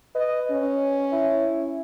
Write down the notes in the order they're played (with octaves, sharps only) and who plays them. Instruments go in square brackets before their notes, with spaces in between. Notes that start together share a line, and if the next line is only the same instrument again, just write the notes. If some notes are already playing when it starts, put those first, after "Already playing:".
[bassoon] B4 [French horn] D#5
[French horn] C#4
[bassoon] E4